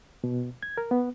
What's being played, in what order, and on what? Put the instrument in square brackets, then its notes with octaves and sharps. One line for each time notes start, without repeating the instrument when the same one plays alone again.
[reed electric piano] B2
G#6
A#4
B3